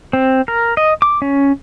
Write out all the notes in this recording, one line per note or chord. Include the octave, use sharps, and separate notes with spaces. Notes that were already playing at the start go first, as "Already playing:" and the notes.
C4
A#4
D#5
D6
C#4